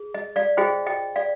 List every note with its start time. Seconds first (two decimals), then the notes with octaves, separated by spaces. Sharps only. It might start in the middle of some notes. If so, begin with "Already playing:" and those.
Already playing: G#4
0.14 D#5
0.36 D5 F5
0.57 F4 G#4 C5 D#5 G5
0.86 D#5 G5
1.16 D5 F5